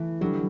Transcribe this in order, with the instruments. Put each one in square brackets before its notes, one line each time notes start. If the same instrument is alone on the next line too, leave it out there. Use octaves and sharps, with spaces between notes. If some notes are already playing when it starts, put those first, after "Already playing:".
Already playing: [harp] E3 A3
[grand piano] D3 G3 [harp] F#3